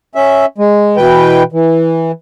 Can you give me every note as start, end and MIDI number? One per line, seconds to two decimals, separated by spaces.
0.15 0.45 61
0.15 0.45 76
0.58 0.97 56
0.97 1.43 47
0.97 1.43 52
0.97 1.43 71
0.97 1.43 79
1.52 2.12 52